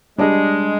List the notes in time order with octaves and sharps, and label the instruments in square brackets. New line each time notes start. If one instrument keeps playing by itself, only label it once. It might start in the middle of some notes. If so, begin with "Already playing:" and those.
[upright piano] G3 D4 G#4 D#5 [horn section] G#3